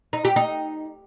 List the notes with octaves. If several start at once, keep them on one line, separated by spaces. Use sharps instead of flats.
D#4
G4
D#4